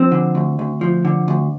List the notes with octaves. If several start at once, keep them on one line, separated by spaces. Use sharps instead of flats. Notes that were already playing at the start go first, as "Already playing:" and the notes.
Already playing: F3 C4
D3
D2
D2
F3
D3
D2